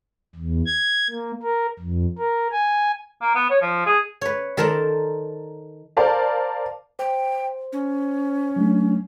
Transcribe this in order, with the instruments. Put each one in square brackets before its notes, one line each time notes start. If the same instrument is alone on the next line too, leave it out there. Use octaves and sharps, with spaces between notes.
[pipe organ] E2
G#6
A#3
A#4
F2
A#4
G#5
[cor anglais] A#3
B3
C#5
F3
G#4
[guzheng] B4 C#5
D#3 A4 A#4 C5 D5 A5
[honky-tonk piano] A#4 C5 D5 F5 A5
[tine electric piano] C5 [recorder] G5
[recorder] C#4
[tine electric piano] F#3 A3 D4